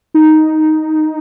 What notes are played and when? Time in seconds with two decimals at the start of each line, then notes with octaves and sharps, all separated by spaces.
0.14 D#4